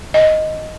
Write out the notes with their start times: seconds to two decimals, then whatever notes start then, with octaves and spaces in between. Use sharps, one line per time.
0.14 D#5